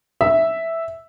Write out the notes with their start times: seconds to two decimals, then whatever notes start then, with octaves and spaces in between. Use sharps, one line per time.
0.21 E5